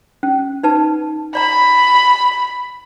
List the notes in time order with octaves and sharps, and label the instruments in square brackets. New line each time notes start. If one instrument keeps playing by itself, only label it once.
[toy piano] C#4
D#4 B4 A5
[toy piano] D5 A#5 [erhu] B5